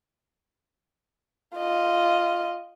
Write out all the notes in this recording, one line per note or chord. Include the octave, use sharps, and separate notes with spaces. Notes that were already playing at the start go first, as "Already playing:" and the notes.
F4 D#5